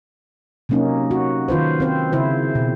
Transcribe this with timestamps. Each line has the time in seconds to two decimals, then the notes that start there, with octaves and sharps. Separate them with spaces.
0.69 C3 F#3 A#3 C#4 D#4
1.11 F#4
1.48 D#3 F4 B4 C5
1.80 C4 C5
2.13 C#3 E4 C5
2.55 B2